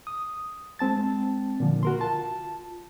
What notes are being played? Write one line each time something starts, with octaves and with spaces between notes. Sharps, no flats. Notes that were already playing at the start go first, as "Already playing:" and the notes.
D#6
G#3 C4 A5 A6
A#2 D3 F3
F#4 A#4 C6
F4 A5